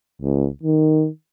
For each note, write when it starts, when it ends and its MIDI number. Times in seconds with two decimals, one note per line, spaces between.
0.22 0.48 37
0.63 1.08 51